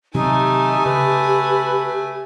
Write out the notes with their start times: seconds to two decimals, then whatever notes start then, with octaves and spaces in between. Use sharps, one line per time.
0.14 C3 D#3 F#3 A3 D#4 G4 G#5
0.86 C#3 B4